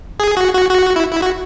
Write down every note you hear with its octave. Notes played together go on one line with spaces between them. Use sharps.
G#4
F#4
F#4
F#4
E4
E4
F#4